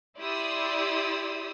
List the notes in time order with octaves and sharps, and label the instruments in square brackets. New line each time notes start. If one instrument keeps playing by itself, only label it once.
[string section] E4 G4 D5 C6 D#6 E6